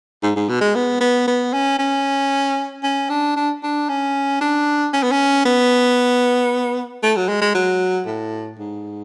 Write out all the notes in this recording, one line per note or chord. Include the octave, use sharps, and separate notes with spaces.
G#2
G#2
B2
G#3
B3
B3
B3
C#4
C#4
C#4
D4
D4
D4
C#4
D4
C#4
B3
C#4
B3
A3
F#3
G#3
G#3
F#3
A2
G#2